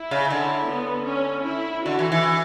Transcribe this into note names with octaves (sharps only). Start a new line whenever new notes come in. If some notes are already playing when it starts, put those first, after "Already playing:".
Already playing: E4
C#3
D3
B3
C#4
E4
D3 F#4
E3
E3